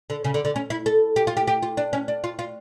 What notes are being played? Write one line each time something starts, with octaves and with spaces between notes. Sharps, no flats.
D3
C#3
D3
D3
C#4
E4
A4
G4
F4
G4
G4
F4
D4
C#4
D4
F4
F4